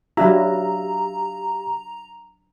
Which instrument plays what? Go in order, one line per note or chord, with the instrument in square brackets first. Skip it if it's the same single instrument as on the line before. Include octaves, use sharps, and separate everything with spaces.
[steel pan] F#3 D4 E4 [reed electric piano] G4 F5 E6 [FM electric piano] A#5